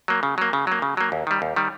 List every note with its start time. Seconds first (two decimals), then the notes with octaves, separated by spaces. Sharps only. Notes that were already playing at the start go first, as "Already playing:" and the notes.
0.08 F#3 A#3
0.23 C#3
0.38 F#3 A#3
0.53 C#3
0.67 F#3 A#3
0.82 C#3
0.97 F#3 A#3
1.12 D#2
1.27 D#3 G3
1.42 D#2
1.56 D#3 G3